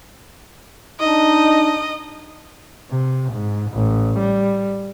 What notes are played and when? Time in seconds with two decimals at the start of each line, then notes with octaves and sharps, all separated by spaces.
1.00 D4 D#4 D#5
2.91 C3
3.33 G#2
3.72 A1
4.19 G3